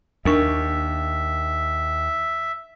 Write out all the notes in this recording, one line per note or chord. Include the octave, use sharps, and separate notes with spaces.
D#2 D4 A#4 E5 C#6